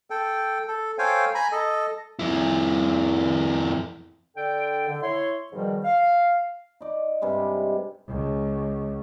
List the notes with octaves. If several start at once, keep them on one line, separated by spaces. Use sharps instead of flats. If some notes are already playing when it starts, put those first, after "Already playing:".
A4 G5
A4
A4 C5 C#5 F5 G5 G#5
G#5 A#5 B5
A4 D#5
F2 E4
D3 A4 G5
D3
E4 C#5 C6
G#2 B2 D#3 F3 G3
F5
D#4 D5
G2 C3 G3 G#3
C#2